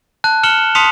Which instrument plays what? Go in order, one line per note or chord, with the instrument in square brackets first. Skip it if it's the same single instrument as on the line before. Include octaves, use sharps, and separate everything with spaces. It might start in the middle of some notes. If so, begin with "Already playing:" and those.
[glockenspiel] A5 F#6
F6 C#7 E7 F#7 G7
A5 C6 D#6 B6 C#7 F7